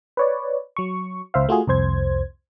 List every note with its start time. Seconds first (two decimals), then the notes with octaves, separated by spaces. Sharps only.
0.17 B4 C#5 D5
0.77 F#3 C#6
1.34 C#2 C5 E5 F5
1.49 A3 F4 F#4 G#4
1.67 C2 F2 C5 G#6